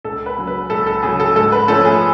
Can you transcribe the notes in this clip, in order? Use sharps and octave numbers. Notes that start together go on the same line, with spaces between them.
C#2 A4
B4
C#3 F#3
B4
C#2 A4
A4
C#3 F#3 G#4
A4
G#2 A4
B4
F3 A3 C#4 A4
G#4